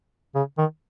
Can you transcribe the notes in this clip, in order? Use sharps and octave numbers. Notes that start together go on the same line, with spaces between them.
C#3
D#3